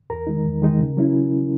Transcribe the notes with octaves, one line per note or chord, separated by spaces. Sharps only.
E2 A#4 A#5
D#3 G#3 D#4
E2
D#3 G#3 D#4
C#3
F#3 C#4 E4